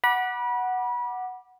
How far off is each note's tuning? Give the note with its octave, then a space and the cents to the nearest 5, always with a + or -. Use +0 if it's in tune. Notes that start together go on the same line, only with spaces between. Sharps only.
F#5 +0 B5 -30 D6 +10